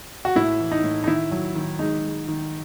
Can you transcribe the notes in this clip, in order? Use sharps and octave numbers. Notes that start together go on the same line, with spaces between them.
F#4
A2 E4
E3
D#4
A2
D#4
D#3 E4
F#3
D#3
G#3 D#4
G#3
D#3